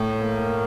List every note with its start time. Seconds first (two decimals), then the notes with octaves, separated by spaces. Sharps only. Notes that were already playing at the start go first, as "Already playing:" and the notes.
Already playing: A2
0.20 A#3